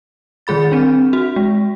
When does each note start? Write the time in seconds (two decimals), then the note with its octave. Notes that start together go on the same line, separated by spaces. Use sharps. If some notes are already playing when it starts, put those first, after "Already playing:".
0.47 D#3 G3 G#4 B5 A6
0.72 C4 D4
1.13 F#4
1.36 G#3